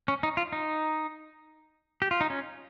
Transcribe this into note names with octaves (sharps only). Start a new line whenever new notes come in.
C#4
D#4
F4
D#4
G4
F4
D#4
C#4